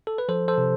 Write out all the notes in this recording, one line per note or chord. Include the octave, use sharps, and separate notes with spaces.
A4
B4
F3 A4 C5
A4 C5
C3